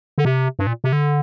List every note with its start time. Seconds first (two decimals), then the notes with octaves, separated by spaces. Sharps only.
0.18 D3
0.25 C3
0.59 G2
0.67 A#2
0.84 C3
0.93 D3